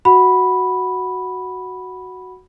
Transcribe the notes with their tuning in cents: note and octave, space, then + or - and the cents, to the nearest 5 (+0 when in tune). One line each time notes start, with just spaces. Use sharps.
F#4 +0 F#5 +0 B5 -5